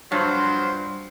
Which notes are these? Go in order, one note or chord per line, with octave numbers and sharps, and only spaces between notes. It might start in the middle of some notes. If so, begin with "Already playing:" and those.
G2 F3 F#3 C5